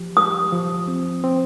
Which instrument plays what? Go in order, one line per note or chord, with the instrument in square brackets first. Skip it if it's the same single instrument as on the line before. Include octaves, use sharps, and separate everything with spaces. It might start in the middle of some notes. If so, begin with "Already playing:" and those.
Already playing: [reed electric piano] F3 G4
[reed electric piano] G4 [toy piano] D#6
[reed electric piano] F3
C4
C4